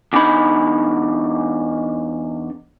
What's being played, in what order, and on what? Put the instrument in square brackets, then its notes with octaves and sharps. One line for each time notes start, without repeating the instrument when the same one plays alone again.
[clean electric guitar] E2 D4 D#4 B5